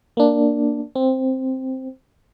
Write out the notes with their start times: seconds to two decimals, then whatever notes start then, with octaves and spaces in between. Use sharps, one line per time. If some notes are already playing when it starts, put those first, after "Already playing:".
0.17 A#3 D4
0.95 C4